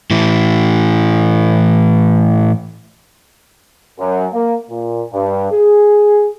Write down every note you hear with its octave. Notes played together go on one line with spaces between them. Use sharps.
A2 E3
F#2
A#3
A#2
G2
G#4